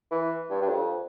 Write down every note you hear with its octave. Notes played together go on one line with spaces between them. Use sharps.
E3
G2
G2
F2